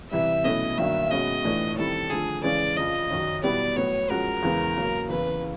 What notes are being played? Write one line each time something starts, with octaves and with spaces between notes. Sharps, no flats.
C3 E3 G3 E5
B2 F#3 A3 C#4 E4 D#5
G2 D#3 F#3 A#3 D4 E5
B2 G#3 C#4 F#4 D#5
A2 E3 A3 D4 F4
D#3 G3 C4 E4 A4
D3 F3 A3 G#4
C#3 E3 G#3 C#4 D5
F2 C#3 F3 D#5
F#2 D#3 F#3
B2 G3 B3 E4 G4 D5
A2 F#3 B3 C#5
F3 G#3 C#4 F#4 A#4
E2 C#3 E3 G#3 B3
C#3 F#3 A#3
E2 C#3 E3 B4